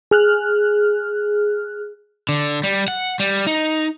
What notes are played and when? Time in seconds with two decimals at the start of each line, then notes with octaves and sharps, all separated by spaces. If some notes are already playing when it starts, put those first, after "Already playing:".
0.11 G#4 F6 F#6
2.29 D3
2.64 G3
2.88 F#5
3.20 G3
3.47 D#4